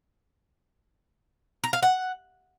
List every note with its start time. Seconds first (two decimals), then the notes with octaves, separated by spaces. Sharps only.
1.64 A#5
1.73 F5
1.83 F#5